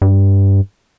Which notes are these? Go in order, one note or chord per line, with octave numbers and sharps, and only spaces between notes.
G2